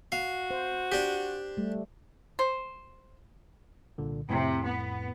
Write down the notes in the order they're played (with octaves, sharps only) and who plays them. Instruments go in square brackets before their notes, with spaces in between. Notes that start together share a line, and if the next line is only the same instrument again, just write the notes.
[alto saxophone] F#4 [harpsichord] F5
[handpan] C5
[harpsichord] D4 G4
[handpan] G3 A3
[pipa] C5
[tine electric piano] C2 A#2 D3
[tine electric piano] F2 A2 [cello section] C3
[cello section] B3